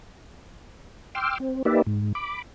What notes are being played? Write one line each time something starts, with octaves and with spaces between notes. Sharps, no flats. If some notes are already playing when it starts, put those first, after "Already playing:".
G5 C6 D6 E6 F6
C4
A#3 D#4 G4 B4 D5 E5
G#2
B5 D6